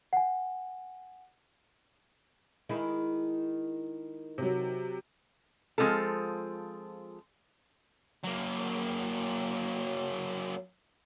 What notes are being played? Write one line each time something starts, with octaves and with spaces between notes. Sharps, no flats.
F#5 G#5
D#3 G#3 E4
C3 F#3
F3 G#3 A#3 C4 F4 A4
F#3 A#3